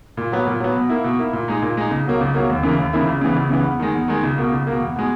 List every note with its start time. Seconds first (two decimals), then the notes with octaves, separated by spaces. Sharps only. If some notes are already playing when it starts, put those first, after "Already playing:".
0.17 A#2
0.32 F#3 B3
0.47 A#2
0.60 F#3 B3
0.76 B2
0.89 A#3 E4
1.04 B2
1.19 A#3 E4
1.33 A#2
1.48 G#3 D#4
1.62 A#2
1.77 G#3 D#4
1.91 C#2
2.05 B2 F#3 A#3
2.21 C#2
2.35 B2 F#3 A#3
2.49 D#2
2.63 C#3 E3 A#3 E4
2.78 D#2
2.93 C#3 E3 A#3 E4
3.07 C#2
3.21 C#3 E3 B3
3.36 C#2
3.50 C#3 E3 B3
3.65 E2
3.80 D#3 G#3
3.94 E2
4.08 D#3 G#3
4.23 C#2
4.38 B2 A#3
4.52 C#2
4.67 B2 A#3
4.81 E2
4.96 B2 G#3